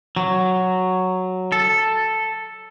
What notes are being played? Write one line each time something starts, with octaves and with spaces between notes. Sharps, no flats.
F#3
A4